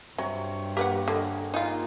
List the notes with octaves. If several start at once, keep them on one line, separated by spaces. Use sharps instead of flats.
G2 C3 F#3 C#5
A#3 F#4 G4 B4 F#5
D3 G#4 D#5
A#2 D#4 F4